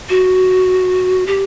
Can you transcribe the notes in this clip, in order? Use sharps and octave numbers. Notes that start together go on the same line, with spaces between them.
F#4
G4